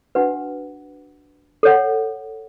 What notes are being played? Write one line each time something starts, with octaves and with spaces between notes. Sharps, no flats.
D4 F#4 B4 F#5
A4 C#5 F#5